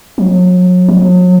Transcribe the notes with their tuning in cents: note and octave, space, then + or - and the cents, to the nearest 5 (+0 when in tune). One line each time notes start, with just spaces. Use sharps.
F#3 -35
F#3 -40